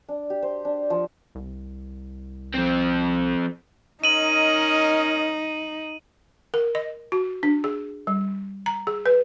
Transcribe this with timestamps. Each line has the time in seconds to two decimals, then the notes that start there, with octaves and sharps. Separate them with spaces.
0.09 D4
0.30 G4
0.42 C5
0.65 D4
0.90 F3
1.35 C2
2.54 F2 C4
4.04 C#4 D#4 A#4 D#5 D#7 F#7
6.54 A#4
6.75 D#5
7.12 F#4
7.43 D4
7.64 G#4
8.07 G3
8.66 A#5
8.87 G#4
9.06 B4